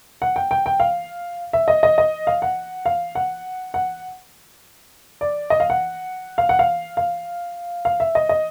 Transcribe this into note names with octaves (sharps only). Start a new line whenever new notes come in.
F#5
G5
G5
G5
F5
E5
D#5
D#5
D#5
F5
F#5
F5
F#5
F#5
D5
D#5
F5
F#5
F5
F#5
F5
F5
F5
E5
D#5
D#5